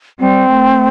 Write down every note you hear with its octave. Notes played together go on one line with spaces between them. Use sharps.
G3 C4
A3